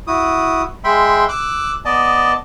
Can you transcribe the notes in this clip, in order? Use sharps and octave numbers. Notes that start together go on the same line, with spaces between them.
E4 F#4 D#6
G#3 E5 G5 B5 C6
D6 E6 F#6
B3 D5 D#5 A5